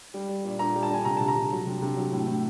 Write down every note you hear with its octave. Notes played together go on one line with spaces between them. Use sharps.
G3
G3
A#2
A#2 A#5
G3
A5
A#2 G#5
C3 A#5
A5
C3
A#5
C3
F#3
C3
C3
F#3
A2
A2